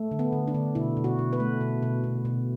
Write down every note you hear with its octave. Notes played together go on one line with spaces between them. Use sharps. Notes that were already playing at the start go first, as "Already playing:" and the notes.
Already playing: A3
D3
B3
D3
D4
D3
B2 E4
B2
F#4
B2
B4
A3
B2
B2
B2
B2